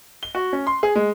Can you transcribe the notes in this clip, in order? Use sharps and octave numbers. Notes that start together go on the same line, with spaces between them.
G7
F#4
C#4
C6
G#4
G#3